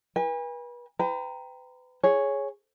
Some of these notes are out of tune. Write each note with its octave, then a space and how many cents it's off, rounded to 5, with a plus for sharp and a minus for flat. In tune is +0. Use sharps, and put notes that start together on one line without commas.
B4 -35 G#5 -40
B4 +35 G5 +0 A#5 +0
G#4 +0 C#5 +0